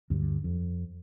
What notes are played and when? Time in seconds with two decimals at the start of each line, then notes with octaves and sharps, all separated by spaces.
0.10 D2 G2
0.44 F2